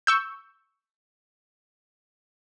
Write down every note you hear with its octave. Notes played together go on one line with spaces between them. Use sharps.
C#6 E6 G6